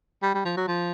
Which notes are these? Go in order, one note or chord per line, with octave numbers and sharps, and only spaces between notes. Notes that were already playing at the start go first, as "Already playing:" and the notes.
G3
G3
F3
F#3
F3